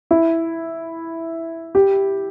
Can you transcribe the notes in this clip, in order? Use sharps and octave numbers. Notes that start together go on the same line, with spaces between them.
E4
G4